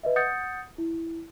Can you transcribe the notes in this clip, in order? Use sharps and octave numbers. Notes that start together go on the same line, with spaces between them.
B4 D#5 E5
F#5 D#6 G6 A6 C#7
E4